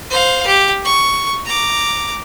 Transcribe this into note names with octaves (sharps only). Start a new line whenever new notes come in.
C5 F5
G4
C#6
A#5 D6